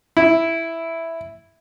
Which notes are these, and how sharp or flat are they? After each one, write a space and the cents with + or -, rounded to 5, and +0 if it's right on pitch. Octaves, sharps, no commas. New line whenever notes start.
E4 +0